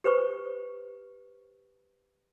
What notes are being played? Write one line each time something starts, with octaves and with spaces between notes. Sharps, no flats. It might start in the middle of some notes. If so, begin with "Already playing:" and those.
G4 B4 C5 C#6